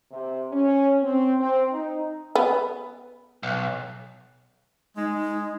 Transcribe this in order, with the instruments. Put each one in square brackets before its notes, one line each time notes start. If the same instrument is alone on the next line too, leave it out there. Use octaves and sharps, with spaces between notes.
[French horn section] C3
C#4
C4
C4
D#4
[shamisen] B3
[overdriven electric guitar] B1
[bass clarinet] G#3 [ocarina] D#4